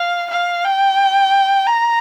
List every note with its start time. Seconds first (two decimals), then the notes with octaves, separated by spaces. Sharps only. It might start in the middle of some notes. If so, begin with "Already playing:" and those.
Already playing: F5
0.30 F5
0.64 G5
1.67 A#5